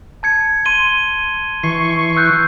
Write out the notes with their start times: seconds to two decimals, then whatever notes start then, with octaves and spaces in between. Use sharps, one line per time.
0.23 A5 G#6 C#7
0.65 C6 D#7 G7
1.63 E3 C#6 C7
2.17 E6 F#6 G6